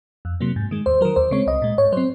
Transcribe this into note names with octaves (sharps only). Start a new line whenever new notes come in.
F2
C3 F#3 A#3
G#2
D#3 G#3
D#2 C5
D#3 F#3 A#4
D#2 C5
C#3 G#3 C4 C#5
C2 D#5
A#2 G#3
G#2 C#5
F#3 C4 C5